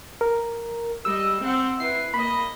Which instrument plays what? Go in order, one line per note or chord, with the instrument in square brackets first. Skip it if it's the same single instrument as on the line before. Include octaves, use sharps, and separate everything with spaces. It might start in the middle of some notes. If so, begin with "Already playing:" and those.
[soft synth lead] A#4
[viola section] G3 D#5 [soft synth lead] E6
[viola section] C4 F#5
[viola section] E4 B4 [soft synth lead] C7
[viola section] A#3 D#5 [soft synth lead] B5